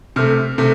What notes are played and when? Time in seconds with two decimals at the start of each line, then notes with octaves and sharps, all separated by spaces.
0.16 C3 A3 F6
0.58 C3 A3